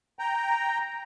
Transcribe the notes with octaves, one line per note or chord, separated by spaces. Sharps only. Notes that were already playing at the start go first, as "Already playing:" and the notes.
G5 A#5